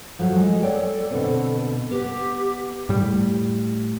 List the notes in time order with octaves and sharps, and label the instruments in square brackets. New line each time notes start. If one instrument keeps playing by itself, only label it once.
[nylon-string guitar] F3 F#3 [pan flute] A4
[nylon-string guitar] G#3
C#5 D5 G5
B2 D3 C4
[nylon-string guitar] B3 [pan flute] G4
[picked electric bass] A2 G3